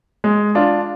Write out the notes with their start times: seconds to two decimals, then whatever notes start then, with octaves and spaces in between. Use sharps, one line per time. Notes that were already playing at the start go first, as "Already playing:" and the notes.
0.24 G#3
0.55 D4 F4